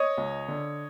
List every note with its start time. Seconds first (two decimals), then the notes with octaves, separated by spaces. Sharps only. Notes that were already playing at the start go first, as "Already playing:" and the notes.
Already playing: C#5 D#5
0.17 C#2
0.48 D3